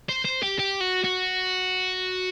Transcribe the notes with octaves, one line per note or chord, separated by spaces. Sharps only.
C5
C5
G4
G4
F#4
F#4